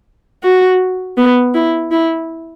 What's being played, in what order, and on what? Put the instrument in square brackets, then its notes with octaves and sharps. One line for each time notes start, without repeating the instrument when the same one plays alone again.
[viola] F#4
B3
E4
E4